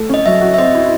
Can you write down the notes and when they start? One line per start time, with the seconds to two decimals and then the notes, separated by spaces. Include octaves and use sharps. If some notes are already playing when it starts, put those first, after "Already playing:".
Already playing: A3
0.09 C#4 D#5
0.26 F#3 E5
0.41 F#4
0.54 E5
0.58 C4 D#5
0.75 E4